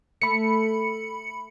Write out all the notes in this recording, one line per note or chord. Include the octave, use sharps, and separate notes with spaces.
A3 B5 C#7